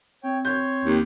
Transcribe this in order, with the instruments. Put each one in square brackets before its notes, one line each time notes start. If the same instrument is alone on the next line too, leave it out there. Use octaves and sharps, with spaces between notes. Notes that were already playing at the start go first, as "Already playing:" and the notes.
[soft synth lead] C4 [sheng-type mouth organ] C#5 G5
[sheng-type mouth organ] C#5 C6 [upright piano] G6
[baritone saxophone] D#2